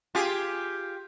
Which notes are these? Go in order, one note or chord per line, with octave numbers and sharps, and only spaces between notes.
F4 G4 G#4